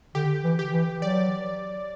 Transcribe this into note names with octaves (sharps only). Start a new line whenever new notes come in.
D3 G4
E3
G4
E3
F#3 D5